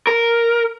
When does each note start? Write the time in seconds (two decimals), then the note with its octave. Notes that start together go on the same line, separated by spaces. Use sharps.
0.07 A#4